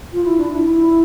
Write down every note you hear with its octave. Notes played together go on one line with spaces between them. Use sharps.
F4
E4
D4
E4